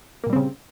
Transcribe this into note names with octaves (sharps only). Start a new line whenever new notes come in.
A#2 C#3 G3 A#3 C4